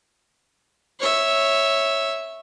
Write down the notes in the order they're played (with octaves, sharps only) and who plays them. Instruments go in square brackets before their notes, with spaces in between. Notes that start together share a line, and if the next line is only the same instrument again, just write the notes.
[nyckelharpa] C#5 E5